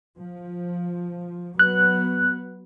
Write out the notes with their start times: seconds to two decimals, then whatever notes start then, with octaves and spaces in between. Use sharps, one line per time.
0.18 F3
1.59 F#3 B3 F#6